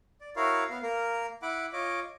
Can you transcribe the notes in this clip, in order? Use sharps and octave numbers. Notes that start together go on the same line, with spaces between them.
D5
E4 F#4 A#4 C#5 F5
B3 F5
A#3 A#4
E4 F#5 B5 D6
F4 C#5 D#5 D6